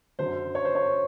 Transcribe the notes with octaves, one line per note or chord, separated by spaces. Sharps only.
F#2 D3 F#3 C5
C#5
C5
C#5